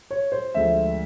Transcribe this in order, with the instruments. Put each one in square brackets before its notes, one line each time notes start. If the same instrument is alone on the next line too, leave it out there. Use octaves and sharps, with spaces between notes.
[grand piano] C#5
C5
D2 D3 F3 G#3 E5